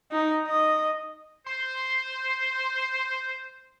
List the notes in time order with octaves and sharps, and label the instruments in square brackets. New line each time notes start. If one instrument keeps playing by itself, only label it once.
[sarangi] D#4
D#5
[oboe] C5 [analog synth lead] C6